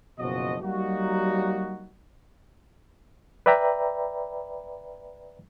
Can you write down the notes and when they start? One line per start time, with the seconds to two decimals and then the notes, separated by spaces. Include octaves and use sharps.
0.19 F#1 B2 F3 F#4 C5 D#5
0.61 F#3 G3 A#3 D#4 F#4
3.46 B4 D5 E5 G5 A#5 B5